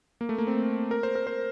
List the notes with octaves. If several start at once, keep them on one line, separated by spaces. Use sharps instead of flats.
A#3
A3
A#3
C4
A#4
C5
A#4
C5